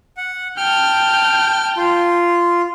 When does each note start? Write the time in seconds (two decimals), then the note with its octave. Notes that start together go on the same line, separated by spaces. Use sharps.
0.17 F#5
0.57 G5 A5 F6
1.77 F4